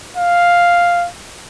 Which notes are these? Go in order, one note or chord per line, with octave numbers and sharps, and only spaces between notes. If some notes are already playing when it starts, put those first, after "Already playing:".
F5